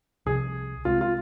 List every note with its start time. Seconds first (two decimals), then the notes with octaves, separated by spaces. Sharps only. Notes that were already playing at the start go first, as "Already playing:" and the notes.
0.26 C2 C3 F3 G#4
0.85 C2 C3 G#3 C4 F4
1.01 F4